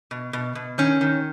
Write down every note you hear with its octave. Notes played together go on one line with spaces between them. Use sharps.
B2
B2
B2
D#3 C#4
D#3